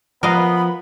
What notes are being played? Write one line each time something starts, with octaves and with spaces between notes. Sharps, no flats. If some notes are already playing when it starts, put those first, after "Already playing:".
F3 B3 A#4 D#5 F5 B5